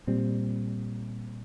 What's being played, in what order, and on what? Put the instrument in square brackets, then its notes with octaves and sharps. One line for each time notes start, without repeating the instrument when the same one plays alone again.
[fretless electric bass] A#2 G3 C4